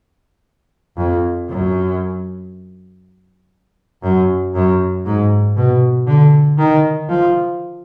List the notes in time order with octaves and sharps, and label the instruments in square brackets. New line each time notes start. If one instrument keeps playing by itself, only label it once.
[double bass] F2
F#2
F#2
F#2
G#2
B2
D3
D#3
F3